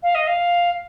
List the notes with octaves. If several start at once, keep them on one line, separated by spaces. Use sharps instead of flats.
F5
D#5
F5